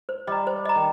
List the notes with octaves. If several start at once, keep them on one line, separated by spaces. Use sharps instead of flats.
C5
G3 D#5 A#5
C5
D#5 A#5
D#3